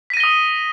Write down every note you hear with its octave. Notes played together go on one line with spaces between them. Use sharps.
D#6 A#6 B6 D#7 G7